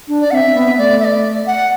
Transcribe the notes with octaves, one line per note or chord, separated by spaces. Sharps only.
D4
D5
C4 E5 F#5
C4
B3
A3 D5
E5
D5
F#5